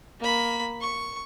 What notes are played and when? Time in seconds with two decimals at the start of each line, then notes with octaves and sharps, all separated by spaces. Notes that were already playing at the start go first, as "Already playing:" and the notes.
0.20 A#3 B5
0.81 C#6